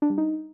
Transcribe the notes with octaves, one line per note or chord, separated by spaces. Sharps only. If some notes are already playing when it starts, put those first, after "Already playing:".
D4
G3
D#4